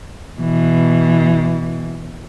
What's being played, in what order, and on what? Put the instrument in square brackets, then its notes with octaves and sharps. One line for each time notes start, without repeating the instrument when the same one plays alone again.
[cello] B2 E3